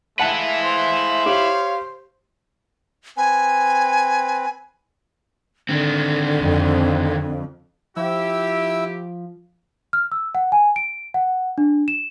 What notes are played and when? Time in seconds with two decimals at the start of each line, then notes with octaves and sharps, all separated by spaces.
0.19 G#3 A3 E4 B4 F5 F#5 A5
0.62 C5
1.26 G4 C#5 F5
3.17 C4 B4 G#5
5.69 D3 D#3 C4
6.42 F2
7.96 F3 E4 G4 E6
9.93 F6
10.12 E6
10.35 F#5
10.52 G#5
10.76 D7
11.14 F#5
11.58 D4
11.88 E7